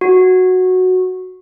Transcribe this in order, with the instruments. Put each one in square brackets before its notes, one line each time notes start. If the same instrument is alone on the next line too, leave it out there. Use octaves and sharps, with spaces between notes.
[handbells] F#4